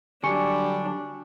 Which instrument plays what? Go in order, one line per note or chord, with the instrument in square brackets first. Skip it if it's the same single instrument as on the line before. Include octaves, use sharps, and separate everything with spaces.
[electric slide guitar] D3 F#3 [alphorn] G3 [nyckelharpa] D4 [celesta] G#5 C#6 C#7